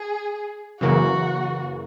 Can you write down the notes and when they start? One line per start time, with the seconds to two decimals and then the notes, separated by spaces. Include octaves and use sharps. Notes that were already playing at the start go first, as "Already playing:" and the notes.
Already playing: G#4
0.81 F#2 C#3 E3 A#3 F#4